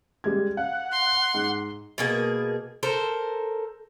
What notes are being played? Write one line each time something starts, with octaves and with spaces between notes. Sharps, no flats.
G3 G#3 G#6
F5 F#5
C6
G#2
B2 A#3 G#4
A4 A#4 C5